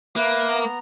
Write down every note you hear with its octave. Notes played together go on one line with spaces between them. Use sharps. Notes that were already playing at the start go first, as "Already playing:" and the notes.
A#3 B4 E5
B3 A#5